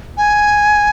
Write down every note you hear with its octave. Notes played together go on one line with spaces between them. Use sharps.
G#5